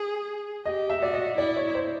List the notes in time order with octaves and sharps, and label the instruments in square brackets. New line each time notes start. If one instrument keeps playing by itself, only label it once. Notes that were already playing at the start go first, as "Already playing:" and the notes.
Already playing: [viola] G#4
[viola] G4 [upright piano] D#5
[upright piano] E5
[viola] F#4 [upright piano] D5
[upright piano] D#5
[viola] E4 [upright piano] D5
[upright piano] C#5
C5